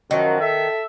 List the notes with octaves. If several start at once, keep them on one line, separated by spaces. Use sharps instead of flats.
F#2 D#3 F3 F#4
A4 E5